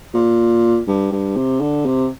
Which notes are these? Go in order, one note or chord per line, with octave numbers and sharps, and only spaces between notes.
A#2
G2
G2
C3
D3
C3